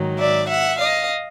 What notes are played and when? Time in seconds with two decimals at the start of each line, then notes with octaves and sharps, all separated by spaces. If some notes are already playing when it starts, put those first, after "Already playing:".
Already playing: G#2 D#3 F#3
0.19 D5 E5
0.49 E5 F#5
0.79 D#5 F5